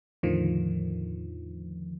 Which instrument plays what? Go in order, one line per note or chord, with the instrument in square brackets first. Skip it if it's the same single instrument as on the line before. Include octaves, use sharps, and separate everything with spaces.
[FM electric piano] E2 A2 D3 D#3 F3